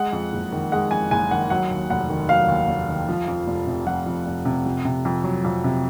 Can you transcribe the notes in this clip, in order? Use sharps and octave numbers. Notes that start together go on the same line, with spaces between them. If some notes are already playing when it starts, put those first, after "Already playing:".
Already playing: G#3 F#5
F2
F#1
D#3
G#3 F#5
F2 G#5
F#1 G#5
D#3 F#5
F#3 F#5
D#2
F1 F#5
D#3
F#3 F5
D#2
F1
D#3
F3
F2
F1
C3
F3 F#5
F2
F1
C3
F2
C3
F2
F#3
F2
C3